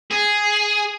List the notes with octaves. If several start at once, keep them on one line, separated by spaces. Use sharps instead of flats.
G#4